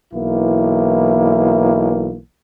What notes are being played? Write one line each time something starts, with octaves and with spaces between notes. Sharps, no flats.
B1 E3 A#3 E4